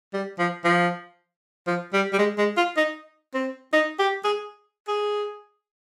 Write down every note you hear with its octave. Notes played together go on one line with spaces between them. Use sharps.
G3
F3
F3
F3
G3
G3
G#3
G#3
F4
D#4
C4
D#4
G4
G#4
G#4